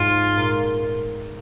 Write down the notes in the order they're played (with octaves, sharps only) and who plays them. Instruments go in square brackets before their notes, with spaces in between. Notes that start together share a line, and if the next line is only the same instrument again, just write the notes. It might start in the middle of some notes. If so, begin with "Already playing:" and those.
Already playing: [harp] G#2 [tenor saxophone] F4
[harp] A#2